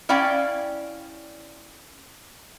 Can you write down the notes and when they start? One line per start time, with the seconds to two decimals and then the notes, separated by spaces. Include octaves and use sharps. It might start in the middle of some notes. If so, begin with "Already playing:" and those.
0.09 C#4 E4 D5 F5 G5